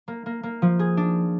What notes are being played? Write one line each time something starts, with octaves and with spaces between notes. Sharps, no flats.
A#3
A#3
A#3
F3
G#4
D4